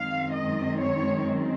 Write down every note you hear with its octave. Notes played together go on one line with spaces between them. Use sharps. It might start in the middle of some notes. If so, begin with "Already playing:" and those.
Already playing: F#2 D#3 G#3 C4 F5
D#5
C#5